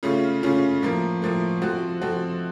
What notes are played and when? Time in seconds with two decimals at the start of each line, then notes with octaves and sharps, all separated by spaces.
0.03 C#3 A3 C#4 F4
0.43 C#3 A3 C#4 F4
0.82 A2 F3 A#3
1.22 A2 F3 A#3
1.62 F3 C4 F#4 A4
2.01 F3 C4 F#4 A4